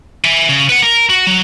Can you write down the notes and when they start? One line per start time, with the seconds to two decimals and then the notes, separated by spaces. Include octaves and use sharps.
0.25 E5 G#5
0.49 C#3
0.69 B4 F#5
0.82 A#4
1.09 F#4
1.27 F#3